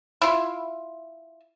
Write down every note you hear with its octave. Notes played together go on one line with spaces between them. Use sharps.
E4 F4